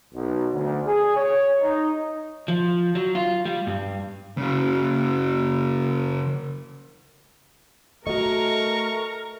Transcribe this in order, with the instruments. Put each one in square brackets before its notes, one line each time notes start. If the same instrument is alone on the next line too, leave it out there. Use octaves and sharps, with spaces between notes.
[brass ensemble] B1
D2
G#4
C#5
D#4
[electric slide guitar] F3
F#3
F4
G3
G2
[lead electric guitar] C#3 F#3
[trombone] A3 [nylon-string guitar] F#4 D#5 [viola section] A#4 A#5 [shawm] C#6